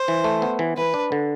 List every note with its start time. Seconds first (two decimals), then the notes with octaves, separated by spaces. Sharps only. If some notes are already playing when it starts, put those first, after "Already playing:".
Already playing: C5
0.08 E3
0.24 A3
0.42 B3
0.59 E3
0.77 E3 B4
0.94 D4
1.12 D3